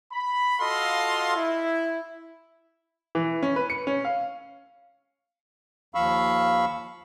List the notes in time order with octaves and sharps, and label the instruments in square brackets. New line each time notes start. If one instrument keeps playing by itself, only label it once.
[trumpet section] B5
F4 F#4 A4 D#5 F5 C6
E4
[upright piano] E3
C#4
B4
C#7
C#4
F5
[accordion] D#2 F3 F5 B5 C#6 E6